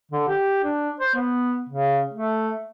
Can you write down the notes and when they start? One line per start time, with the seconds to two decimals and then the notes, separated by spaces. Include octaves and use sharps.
0.11 D3
0.28 G4
0.63 D4
1.00 C5
1.15 B3
1.69 C#3
2.13 A3